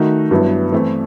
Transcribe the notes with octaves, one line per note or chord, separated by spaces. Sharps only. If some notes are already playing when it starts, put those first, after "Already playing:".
Already playing: D#3 A3 D#4 F#4
G2 F#3 B3 E4
E3 A3 C4 E4